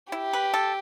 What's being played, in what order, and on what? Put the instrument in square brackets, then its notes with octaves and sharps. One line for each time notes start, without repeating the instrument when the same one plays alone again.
[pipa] E4 [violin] G4
[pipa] B4
A4